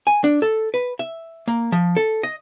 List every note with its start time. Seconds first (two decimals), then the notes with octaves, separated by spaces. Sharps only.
0.07 G#5
0.24 D4
0.42 A4
0.74 B4
0.99 E5
1.48 A#3
1.72 F3
1.96 A4
2.23 D#5